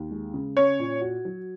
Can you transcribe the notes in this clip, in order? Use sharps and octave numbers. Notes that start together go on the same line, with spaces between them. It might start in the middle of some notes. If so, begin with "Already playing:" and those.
Already playing: D#2
G#3
C#3
C#4 C#5
A#2
F#4
F#3